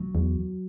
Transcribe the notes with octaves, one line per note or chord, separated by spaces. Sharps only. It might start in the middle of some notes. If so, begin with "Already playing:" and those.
Already playing: F#3
E2